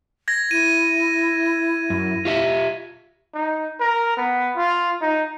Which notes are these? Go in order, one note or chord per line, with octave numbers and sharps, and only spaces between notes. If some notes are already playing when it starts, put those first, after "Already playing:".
G#6 A#6
E4 D#7
F#2
F4 G4 E5
D#4
A#4
B3
F4
D#4